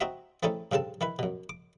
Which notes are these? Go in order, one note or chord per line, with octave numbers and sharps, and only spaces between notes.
C4 D#4 F#4 E5
E3 A3 C4 C#4 D#4 A4
G2 C#3 C4 A4 A5
D#3 E4 B4
F#2 B2
D6